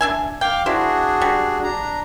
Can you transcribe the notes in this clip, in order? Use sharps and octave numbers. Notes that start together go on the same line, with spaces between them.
D4 E5 G#5
F5 G5 D6 F6
D4 E4 F#4 G#4 C5
G3
D4 A#5